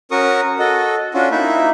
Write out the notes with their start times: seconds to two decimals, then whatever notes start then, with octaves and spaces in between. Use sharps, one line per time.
0.11 C#4 F#4 A#4 C#6 D#6
0.59 F#4 A4 D#5
1.14 C#4 D4 F4 F#4
1.31 A#3 D#4 E4 E5